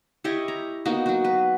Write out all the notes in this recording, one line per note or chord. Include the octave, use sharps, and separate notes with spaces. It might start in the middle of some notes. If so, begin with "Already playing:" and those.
E4 G4 C#5 D#5
A#5
A#3 B3 D#4 F#4
F#3 F#4
B4